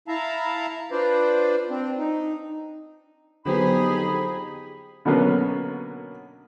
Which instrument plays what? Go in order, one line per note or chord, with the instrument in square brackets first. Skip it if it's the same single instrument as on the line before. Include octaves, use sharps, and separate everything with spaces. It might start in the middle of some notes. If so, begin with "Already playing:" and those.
[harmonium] E4 E5 F5 A5 A#5
D4 F4 B4 C5 D5
C4 D4
D#4
[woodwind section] F2 D#4 B5 [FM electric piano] D3 F#3 B3 [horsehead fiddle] G4 G#4
[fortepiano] B2 D3 F#3 A#3 B3 C#4